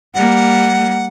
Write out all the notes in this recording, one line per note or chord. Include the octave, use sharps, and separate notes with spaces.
G3 A#3 F#5